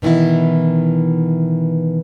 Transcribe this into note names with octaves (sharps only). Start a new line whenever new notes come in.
B2 D#3 E3 B3 E4